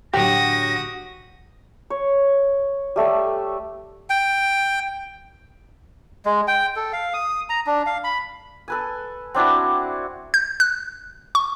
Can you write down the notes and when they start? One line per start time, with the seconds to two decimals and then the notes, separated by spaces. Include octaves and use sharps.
0.14 A2 D3 F#3 F#4 G4 D#6 A#6
1.90 C#5
2.96 G3 A3 A4 D5
4.10 G5
6.25 G#3
6.48 G5
6.76 A4
6.93 F5
7.14 D#6
7.49 A#5
7.66 D4
7.86 F5
8.04 B5
8.68 A4 B4 G#5
9.34 C4 D4 E4 F#4
10.34 G6
10.60 F#6
11.35 C#6